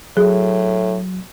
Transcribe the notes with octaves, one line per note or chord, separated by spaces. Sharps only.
A2 F#3 G#4